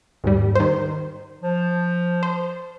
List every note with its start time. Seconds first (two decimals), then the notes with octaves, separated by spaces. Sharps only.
0.24 D#2 G#2 G3
0.55 D#3 C5
1.42 F3
2.23 C5